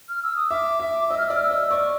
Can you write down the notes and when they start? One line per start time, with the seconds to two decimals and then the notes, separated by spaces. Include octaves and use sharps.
0.09 F6
0.23 E6
0.36 D#6
0.50 E5 D6
0.80 E5
1.10 D#5 E6
1.18 F6
1.27 D5 E6
1.35 F6
1.43 E6
1.51 D#5
1.71 D5 C#6